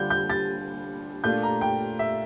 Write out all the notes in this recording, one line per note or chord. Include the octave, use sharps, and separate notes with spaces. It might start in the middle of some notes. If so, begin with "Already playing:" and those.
Already playing: D3 G3 D4 F4 G6
G6
A6
A#2 A3 D4 F4 G6
A#5
G5
E5